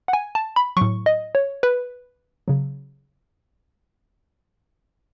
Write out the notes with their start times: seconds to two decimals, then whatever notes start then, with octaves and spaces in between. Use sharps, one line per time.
0.08 F#5
0.13 G#5
0.35 A5
0.56 B5
0.77 A2 F#3 C#6
1.06 D#5
1.35 C#5
1.63 B4
2.48 C#3 F#3